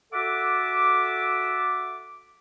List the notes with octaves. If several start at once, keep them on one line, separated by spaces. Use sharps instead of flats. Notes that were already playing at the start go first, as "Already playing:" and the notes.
F#4 A4 E5 F#5 D6